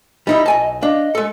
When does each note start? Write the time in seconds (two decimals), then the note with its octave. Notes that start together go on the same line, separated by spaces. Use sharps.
0.27 G3 D#4 E4 D#5
0.46 B1 G#5 A5
0.82 D4 D#5 F5
1.15 G#3 A4